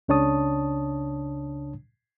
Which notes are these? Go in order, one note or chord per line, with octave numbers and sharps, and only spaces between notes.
C#2 C#3 D4 C#5 A5 D#6